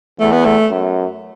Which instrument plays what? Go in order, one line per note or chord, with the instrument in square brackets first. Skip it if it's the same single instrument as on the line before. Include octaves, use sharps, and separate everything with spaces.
[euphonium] E2 [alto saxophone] A3
[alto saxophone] B3
A3
[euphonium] F#2